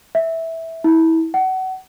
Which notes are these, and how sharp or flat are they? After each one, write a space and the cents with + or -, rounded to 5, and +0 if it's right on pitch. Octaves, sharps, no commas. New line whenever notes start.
E5 -10
E4 -25
F#5 +30